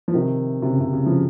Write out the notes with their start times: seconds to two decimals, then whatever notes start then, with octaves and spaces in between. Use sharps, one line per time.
0.08 F3
0.14 C3 D#3
0.62 C3
0.67 C#3
0.80 C3
0.93 C#3
1.06 C#3 F3